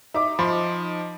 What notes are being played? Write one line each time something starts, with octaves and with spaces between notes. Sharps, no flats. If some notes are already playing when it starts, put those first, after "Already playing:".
D#4 E5 D6
F3 B5 C6